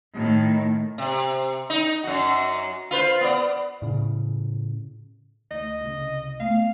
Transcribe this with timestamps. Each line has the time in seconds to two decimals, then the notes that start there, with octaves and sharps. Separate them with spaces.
0.14 A2 D#3
0.98 C3
1.70 D#4
2.04 F#2 F#4
2.91 F4 B4 C5
3.21 B3 D5
3.82 A2 C#3
5.51 D2 D#5
5.81 C2 C#3
6.40 A3 B3 F5